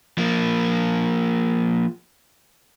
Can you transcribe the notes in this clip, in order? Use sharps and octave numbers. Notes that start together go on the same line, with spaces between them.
F3 A#3